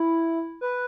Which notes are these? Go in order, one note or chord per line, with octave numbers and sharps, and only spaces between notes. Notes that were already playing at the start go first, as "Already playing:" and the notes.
Already playing: E4
B4